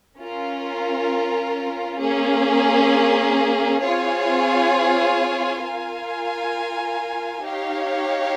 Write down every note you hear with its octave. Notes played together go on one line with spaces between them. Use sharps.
C#4 F4 A#4
A#3 C#4 G#4
C4 F4 G#4 C#5 G#5
F4 A#4 F5 G#5
D#4 G4 C#5 F5